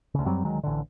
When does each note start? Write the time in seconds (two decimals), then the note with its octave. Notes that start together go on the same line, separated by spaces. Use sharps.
0.14 D2 C#3
0.26 F#2 F#3 G3 C4
0.45 D2 D#3 F#3 G#3
0.63 A1 D3